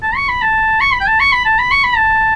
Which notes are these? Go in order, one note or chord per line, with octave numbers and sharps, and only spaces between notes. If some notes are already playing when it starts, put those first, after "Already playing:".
A5
C#6
B5
A5
C#6
B5
G5
A5
C#6
B5
A5
B5
C#6
B5
A5